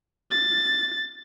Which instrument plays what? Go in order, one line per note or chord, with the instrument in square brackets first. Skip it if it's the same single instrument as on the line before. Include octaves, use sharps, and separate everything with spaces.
[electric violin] A6